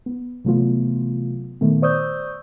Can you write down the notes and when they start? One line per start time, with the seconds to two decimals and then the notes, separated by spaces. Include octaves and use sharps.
0.06 B3
0.44 C3 E3 F#3 A3 B3 F4
1.61 A#2 D#3 A3 B3
1.82 C5 D5 C#6 D#6 E6 G6